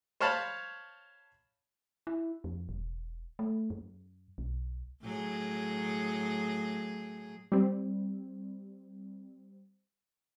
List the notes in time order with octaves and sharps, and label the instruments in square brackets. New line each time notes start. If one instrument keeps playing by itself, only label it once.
[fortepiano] C5 C#5 F5 A5 B5
[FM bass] E4
F2
E1
A3
F#2
B1
[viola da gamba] A2 F#3 G#4
[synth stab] G3 C4